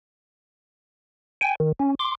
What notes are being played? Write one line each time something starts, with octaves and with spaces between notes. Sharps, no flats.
G5 G#5
D#3
C#4
C6 D6